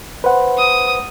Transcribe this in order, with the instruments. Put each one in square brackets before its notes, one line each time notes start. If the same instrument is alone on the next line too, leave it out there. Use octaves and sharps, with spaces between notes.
[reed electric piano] B4 C5 F#5
[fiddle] D#6